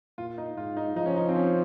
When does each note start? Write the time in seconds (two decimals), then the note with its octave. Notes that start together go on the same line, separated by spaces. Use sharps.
0.18 A#2 F4
0.38 D#4
0.57 G#2 F4
0.77 D#4
0.96 F3 D#4
1.06 C#4
1.16 D#4
1.28 C4
1.35 C#4